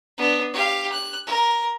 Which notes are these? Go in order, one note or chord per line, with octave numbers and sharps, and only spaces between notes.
B3 D4
G4 F5
F#6
A#4